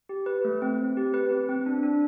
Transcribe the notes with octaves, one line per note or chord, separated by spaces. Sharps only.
G4
B4
A3
C4
C4
G4
B4
C4
C4
D4
D4